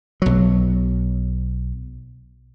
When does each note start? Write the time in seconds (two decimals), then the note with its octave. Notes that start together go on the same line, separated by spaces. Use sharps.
0.22 B1 F#3